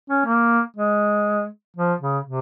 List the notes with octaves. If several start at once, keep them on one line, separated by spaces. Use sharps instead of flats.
C#4
A#3
G#3
F3
C#3
C3